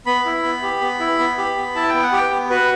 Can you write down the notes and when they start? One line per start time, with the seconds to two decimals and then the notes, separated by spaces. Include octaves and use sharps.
0.06 B3 B5
0.25 E4
0.44 B3
0.63 G4
0.81 B3
1.00 E4
1.19 B3
1.38 G4
1.57 B3
1.75 E4 A5
1.89 B3 G5
2.03 F#5
2.12 G4
2.17 G5
2.31 B3
2.50 F#4 B4